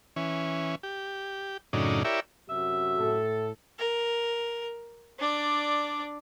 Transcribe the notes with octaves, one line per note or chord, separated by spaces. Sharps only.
E3 C#4
G4
F#2 A2 C#3 D4 D#4
E4 G4 A#4 C#5 D5 E5
F#2 C3 F#4 E5
A2 A4
A#4
D4 D5